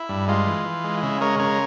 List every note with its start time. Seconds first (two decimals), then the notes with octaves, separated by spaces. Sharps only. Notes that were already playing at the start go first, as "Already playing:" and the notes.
Already playing: E4
0.09 G2
0.28 G#3 F4
0.47 E3
0.65 E3
0.84 G#3
1.02 C#3 E4
1.21 G#3 A#4 C#5
1.39 C#3 A#4 C#5